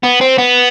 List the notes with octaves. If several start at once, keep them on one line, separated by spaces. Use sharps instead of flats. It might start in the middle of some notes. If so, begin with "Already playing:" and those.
B3
C4
B3